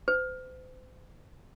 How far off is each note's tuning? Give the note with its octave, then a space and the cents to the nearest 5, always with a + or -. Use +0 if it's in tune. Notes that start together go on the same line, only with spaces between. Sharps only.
C5 -40